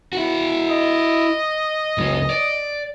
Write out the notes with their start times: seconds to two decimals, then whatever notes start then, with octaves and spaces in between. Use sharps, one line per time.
0.13 E4 F#4
0.67 D#5
1.98 C#2 F#3
2.30 D5